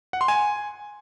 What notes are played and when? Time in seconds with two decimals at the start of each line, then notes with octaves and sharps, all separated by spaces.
0.13 F#5
0.21 C6
0.28 G#5